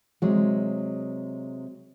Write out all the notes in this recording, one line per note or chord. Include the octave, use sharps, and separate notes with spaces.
C3 F#3 G#3